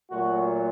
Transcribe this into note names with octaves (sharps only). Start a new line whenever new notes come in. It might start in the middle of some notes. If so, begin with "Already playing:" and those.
A#2 F#3 A3 F#4